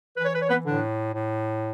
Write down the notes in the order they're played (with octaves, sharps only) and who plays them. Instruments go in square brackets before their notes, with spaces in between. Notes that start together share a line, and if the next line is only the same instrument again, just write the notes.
[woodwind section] E3 B4
C#5
B4
C#5
B3 B4
A2 D3 D4
A2